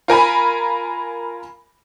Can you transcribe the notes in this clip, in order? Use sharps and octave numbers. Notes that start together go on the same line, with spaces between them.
F4 A#4 G#5 B5